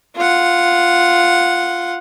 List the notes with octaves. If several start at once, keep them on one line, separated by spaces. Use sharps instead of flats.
F4 F#5